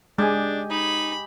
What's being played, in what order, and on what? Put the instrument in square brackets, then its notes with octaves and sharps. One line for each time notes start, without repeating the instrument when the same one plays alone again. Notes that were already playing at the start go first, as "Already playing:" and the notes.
[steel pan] G#3 [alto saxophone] D4 [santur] G4 D#5 G#5
[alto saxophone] D#4 [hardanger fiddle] B5